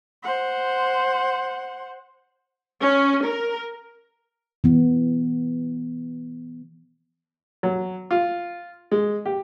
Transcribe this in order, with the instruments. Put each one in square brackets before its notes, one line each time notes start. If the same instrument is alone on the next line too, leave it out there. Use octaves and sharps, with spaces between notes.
[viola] C5 F#5
[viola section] C#4
A#4
[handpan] E3 B3
[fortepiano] F#3
F4
G#3
G4